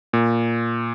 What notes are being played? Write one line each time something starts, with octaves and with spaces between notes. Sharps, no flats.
A#2